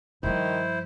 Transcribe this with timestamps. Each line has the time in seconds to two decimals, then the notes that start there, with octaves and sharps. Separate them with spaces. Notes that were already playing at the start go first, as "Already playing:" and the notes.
0.23 G2 D#3 F3 E4 C5